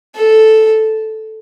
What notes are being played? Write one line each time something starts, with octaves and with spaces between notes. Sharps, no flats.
A4